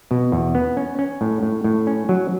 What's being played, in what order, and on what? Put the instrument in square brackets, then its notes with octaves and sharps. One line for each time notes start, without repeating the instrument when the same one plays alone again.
[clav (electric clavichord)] B2
E2
B3
C#4
C#4
A2
A2
A2
C#4
F#3